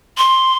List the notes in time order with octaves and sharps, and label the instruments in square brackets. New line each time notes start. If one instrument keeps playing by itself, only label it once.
[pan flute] C6